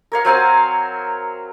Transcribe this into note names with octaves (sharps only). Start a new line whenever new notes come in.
A#4 C#5 F5
F#3 C4 F5 G#5